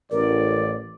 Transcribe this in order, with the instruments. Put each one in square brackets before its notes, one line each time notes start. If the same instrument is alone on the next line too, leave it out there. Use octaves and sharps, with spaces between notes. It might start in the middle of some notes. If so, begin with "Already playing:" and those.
[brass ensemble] A1 [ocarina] A#4 [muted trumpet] D5